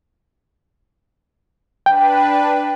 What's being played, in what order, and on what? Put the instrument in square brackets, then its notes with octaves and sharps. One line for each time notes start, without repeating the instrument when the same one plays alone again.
[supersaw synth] D4 B4 [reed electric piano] G5